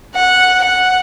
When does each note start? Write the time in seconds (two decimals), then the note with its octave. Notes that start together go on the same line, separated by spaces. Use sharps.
0.15 F#5
0.64 F#5